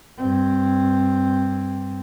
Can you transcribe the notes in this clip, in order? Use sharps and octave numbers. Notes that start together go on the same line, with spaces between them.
G2 C4